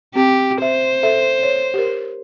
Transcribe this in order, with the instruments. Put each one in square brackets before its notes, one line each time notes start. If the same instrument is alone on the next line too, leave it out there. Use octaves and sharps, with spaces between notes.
[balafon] C4 [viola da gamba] G4
[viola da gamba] C5 [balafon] E5
[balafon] A4 E5
C#5
G4 A#4